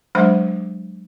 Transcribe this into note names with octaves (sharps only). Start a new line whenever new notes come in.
F#3 G#3 D4 C5 E5 B5